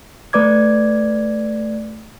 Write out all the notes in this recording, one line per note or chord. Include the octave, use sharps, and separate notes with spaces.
A3 B4 D5 D6 G#6